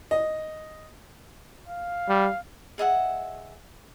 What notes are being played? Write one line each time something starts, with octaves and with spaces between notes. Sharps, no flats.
D#5
F5
G3
G#4 D#5 E5 F#5